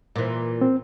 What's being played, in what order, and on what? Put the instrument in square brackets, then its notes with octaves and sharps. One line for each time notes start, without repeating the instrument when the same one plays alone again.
[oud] A#2 E3
[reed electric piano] C4